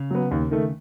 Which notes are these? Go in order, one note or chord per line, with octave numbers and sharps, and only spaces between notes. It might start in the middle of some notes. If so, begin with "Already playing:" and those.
Already playing: C#3
F#3 B3
D#2
D#3 A3